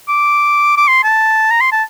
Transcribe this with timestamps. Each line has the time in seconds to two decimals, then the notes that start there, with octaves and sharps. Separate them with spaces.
0.08 D6
0.77 D6
0.88 C6
1.04 A5
1.51 A#5
1.61 C6
1.72 A5